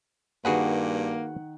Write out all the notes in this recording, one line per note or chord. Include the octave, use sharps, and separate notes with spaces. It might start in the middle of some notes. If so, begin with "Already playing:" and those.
G2 D#3 A#3 F#4 G#4 B4 F#5